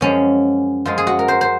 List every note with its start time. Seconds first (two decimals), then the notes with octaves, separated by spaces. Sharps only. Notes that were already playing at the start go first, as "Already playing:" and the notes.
0.01 F#2 F3 G#3 C#4
0.85 F#2 F3 G#3 F4
0.98 G#4
1.07 F#4
1.19 A#4
1.28 C5
1.41 C5